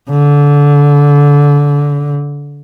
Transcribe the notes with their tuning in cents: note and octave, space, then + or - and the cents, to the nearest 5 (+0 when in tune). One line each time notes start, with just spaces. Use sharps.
D3 -25